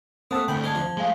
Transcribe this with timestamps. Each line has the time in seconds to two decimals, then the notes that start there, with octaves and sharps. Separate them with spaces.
0.31 A3 A#3 C4 F#5 A5 D#6 E6
0.48 D2 A2 G5 G#5 B5
0.64 G#3 F5 A5 G#6 G7
0.75 F3
0.97 G#3 A3 F5 G#5 G7